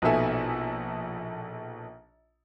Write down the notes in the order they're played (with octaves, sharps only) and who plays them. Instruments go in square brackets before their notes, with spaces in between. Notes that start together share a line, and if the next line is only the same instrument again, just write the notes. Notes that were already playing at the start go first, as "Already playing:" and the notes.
[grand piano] A#1 B2 D#4 A4 E5 G#5